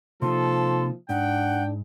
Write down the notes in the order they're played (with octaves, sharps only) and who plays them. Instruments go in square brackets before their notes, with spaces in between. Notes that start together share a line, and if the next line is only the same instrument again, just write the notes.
[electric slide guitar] C3 A#3 D#4 [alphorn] F3 [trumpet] A4 [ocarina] C6
[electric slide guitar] G#2 [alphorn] D4 [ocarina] F#5 [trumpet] G5